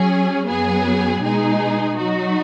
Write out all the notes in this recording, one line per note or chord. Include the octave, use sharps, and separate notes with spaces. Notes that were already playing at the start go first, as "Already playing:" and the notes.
Already playing: F#3 C#4 G#4
F#2 F#3 B3 G#4
B2 G#3 D#4 G#4
F#3 D#4 F#4